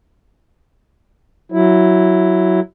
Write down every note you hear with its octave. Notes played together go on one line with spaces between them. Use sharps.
F#3 E4